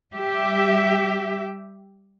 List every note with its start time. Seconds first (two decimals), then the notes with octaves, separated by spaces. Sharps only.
0.15 G3 G4 E5